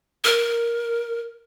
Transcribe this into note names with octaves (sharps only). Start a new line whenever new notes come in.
A#4